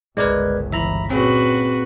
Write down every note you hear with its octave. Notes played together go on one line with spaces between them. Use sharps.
G1 C#2 G#2 G#3 A#4 B4 D5 G#6
E3 E5 A#5 B5
A#2 C4 C#4 F#4 G#4 B4